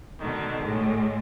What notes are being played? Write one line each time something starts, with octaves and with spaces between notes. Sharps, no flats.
B2 D3 D#3
A2 G#3